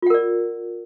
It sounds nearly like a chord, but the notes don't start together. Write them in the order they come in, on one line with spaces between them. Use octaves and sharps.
F4 F#5 A#4 D5